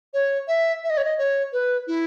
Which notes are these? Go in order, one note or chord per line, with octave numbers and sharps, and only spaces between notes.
C#5
E5
E5
D#5
C#5
D#5
C#5
B4
E4